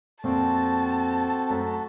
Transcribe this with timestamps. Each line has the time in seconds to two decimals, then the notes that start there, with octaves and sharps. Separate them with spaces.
0.24 F2 A#2 C4 F#4 A4 A5
1.50 F#2 A3 F#5